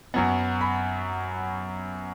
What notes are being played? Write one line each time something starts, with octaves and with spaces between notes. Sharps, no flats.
F#2 F#3 B3 F#5
B5